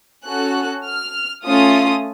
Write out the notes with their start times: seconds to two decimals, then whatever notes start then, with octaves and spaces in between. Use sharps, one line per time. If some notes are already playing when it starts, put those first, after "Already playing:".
0.25 C#4 F#4 A4 F#6
0.86 F6
1.46 A3 C#4 F4 D#6